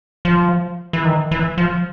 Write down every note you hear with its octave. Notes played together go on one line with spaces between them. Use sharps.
F3
E3
D#3
E3
F3